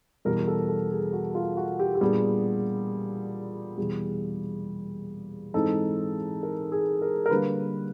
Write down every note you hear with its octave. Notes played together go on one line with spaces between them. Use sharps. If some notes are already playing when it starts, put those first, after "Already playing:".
E2 B2 G3 A#4
A4
A4
G#4
F#4
F4
F#4
G4
G4
A#2 G3 B3 D4 G#4
E2 B2 G3 G#4
G#2 E3 G#3 C4 D#4 A4
A#4
G#4
A#4
A#4
D3 G3 A#3 B4